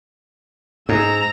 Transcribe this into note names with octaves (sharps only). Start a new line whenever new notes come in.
G#2 A#5 E6